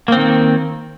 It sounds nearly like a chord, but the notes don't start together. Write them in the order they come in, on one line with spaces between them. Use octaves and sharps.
A#3 C4 D#3